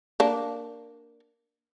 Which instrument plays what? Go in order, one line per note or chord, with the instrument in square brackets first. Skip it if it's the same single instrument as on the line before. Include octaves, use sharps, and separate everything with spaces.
[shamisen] A#3 D4